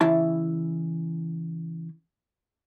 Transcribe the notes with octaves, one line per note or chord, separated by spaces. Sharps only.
C#3 E3 E4 A5